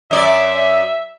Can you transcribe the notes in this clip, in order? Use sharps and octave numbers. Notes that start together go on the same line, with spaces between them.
F#2 D5 E5